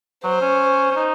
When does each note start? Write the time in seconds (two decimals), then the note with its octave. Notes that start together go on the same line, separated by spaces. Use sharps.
0.24 F#3 C5
0.41 C#4
0.91 C#4
0.96 D#4